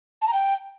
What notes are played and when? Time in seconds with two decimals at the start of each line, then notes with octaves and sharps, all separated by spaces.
0.21 A5
0.27 A#5
0.33 G5